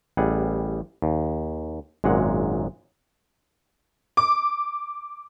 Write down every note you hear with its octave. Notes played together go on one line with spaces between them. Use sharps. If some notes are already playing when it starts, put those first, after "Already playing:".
A1 G3 G#4 F#5
D#2
G#1 F#2 A#2 G#3 F#5
D6